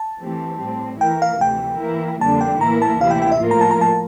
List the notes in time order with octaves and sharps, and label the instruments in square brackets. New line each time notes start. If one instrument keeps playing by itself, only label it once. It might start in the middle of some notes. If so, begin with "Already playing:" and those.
Already playing: [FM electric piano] A5
[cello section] E3 A3 C4 G4
A2 G3 C4
[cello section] E3 A3 E4 A#4 [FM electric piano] G5
[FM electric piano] F5
[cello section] D2 C3 E3 A3 [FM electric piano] G5
[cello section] E3 A#3 E4 A#4
[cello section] F2 D3 G3 A#3 D4 [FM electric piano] A5
[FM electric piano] G5
[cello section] A2 E3 A#3 E4 A#4 [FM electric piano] A#5
[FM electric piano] A5
[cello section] D2 C3 E3 A#3 E4 [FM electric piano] F5
[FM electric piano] G5
G5
E5
[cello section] A2 F3 A#3 F4 A#4
[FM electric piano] A#5
A5
A#5
A5